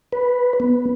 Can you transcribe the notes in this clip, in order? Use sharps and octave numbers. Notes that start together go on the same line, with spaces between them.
B4
B3